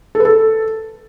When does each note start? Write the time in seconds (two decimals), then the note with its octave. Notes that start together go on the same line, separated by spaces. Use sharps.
0.15 A4
0.20 B4
0.25 A4